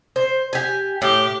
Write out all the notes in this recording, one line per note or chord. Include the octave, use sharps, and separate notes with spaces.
C5
G4 G#5
A2 G4